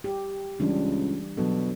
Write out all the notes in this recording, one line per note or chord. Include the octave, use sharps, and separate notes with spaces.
G4
C#2 E3 G3 D4
B2 F#3 D4 A4